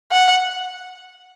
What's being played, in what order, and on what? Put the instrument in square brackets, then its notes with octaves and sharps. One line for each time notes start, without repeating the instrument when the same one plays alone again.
[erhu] F#5